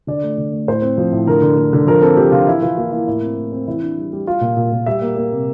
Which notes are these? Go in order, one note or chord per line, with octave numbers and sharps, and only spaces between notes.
D3 D5
A3
D3
A3
A2 C5
C4
F3
A2
D3 A#4
D3
D3
D3
F3 A#4
C4 A4
F3 G4
D3 F4
E3 E4
E3 F4
A#3 F4
A#3 E4
A2 E4
C4
A2
C4
E3 E4
D4
G3
G3
G3 F4
A#2
A#2
A#2
G3 E5
A#3
A#3
C3